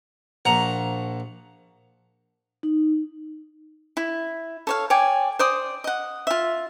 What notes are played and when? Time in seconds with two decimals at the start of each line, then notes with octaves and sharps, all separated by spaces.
0.45 A#1 F#5 A#5
2.63 D#4
3.97 E4
4.67 A4 C#5 F5
4.90 C#5 D5 G5 G#5
5.39 C5 D5 D#6
5.84 D#5 F#5
6.27 F4 E5